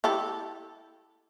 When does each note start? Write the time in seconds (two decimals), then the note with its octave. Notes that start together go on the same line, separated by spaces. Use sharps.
0.04 E4 G4 A4